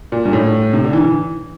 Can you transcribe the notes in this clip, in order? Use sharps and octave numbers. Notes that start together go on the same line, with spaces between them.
A#2
G2
A2
C3
D3
E3
E3